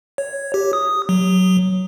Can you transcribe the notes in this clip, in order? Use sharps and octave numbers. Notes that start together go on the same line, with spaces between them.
C#5
G4
D#6
F#3